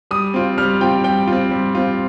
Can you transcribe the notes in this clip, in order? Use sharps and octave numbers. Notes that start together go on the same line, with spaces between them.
G3 D#6
C4 F4
G3 F6
C4 F4 G5
G3 G5
C4 F4
G3
C4 F4